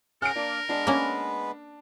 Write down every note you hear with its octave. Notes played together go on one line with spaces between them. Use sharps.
C#4 G#4 A#4 F#5 F6 D7
A#3 D4 D5
G#3 B3 D4 B4
A#3 C#4